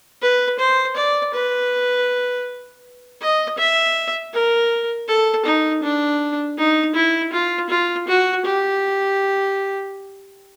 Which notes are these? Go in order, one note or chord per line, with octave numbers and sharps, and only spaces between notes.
B4
C5
D5
B4
D#5
E5
A#4
A4
D#4
D4
D#4
E4
F4
F4
F#4
G4